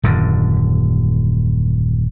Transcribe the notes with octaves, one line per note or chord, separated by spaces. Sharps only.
D#1 F#2 D3